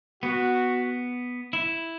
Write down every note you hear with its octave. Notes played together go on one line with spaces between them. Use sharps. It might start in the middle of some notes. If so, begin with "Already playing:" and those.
B3 F#4
E4